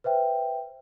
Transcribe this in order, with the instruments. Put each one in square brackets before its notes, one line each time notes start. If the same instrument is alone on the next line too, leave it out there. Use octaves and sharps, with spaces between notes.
[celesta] B4 C5 E5 G5